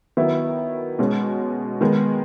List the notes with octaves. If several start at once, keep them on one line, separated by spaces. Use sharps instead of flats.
D#3 F#3 B3 E4
B2 G#3 C#4
D#3 G#3 B3